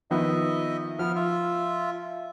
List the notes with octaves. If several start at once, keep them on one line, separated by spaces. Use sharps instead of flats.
D#3 F3 B3 D#5 E5
F3 B3 F6
F4 E5